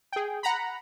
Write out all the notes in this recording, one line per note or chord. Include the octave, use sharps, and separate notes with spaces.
G#4 G5
F#5 A#5 B5